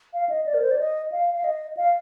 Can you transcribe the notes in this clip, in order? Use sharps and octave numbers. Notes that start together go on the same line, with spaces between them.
F5
D#5
D5
A#4
C5
D5
D#5
F5
F5
D#5
F5